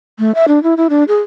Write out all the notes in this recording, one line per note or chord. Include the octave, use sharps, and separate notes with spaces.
A3
E5
D4
E4
E4
D4
G#4